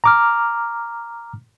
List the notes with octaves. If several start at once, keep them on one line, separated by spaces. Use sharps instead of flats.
A#5 D6 F6